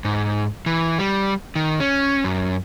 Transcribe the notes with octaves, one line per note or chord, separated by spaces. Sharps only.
G#2
E3
G3
D#3
C#4
F#2